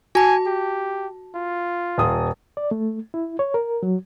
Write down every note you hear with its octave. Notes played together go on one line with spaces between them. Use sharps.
F#4 G#5 A5
G4
F4
D#1 D#6
D5
A3
E4
C#5
A#4
F#3